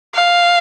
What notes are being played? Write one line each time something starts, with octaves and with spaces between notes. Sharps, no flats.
F5